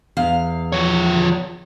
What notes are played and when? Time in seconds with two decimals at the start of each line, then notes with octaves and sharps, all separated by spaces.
0.17 E2 F5
0.73 F3 C#5